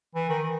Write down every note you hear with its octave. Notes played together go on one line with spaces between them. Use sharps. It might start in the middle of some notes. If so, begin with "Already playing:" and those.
E3
D#3